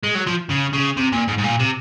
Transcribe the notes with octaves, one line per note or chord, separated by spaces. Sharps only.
G#3
F#3
F3
C#3
C#3
C3
A#2
G#2
G#2
A#2
C3